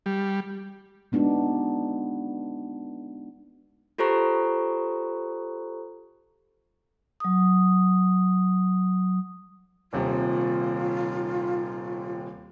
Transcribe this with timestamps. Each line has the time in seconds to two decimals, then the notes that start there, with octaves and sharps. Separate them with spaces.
0.06 G3
1.12 G#3 B3 D4 D#4 F#4
3.98 F4 G4 A4 C5 A#5 C#6
7.20 F#3 D#6
9.93 D#1 D#2 C3 F4